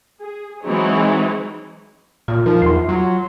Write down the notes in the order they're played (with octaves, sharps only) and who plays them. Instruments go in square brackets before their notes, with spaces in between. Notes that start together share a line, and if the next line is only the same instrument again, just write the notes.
[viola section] G#4
E3 F#3 G#3 C4 D#4 C#5
[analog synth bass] A#2 [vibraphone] F4
[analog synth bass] F3 [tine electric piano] D#4 A#4
[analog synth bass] E2 [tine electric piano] C6 C7
[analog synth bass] F#3